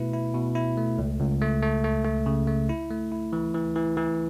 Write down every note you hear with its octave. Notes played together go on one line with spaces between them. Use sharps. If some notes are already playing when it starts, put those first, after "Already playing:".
Already playing: B2 A3 E4 B4
E4
B2
E4
A3
C#2
C#2
A3
A3
A3
A3
C#3
A3
E4
A3
E4
E3
E3
E3
E3